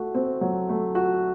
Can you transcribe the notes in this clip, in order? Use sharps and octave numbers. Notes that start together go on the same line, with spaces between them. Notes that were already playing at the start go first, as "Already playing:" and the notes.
Already playing: A3 F#4
C4
F#3
A3
F#4